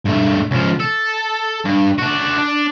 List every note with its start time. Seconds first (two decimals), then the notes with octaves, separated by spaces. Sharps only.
0.05 G2 A3
0.51 C#2 F3
0.80 A4
1.65 G2
1.98 D4 F#4
2.38 D4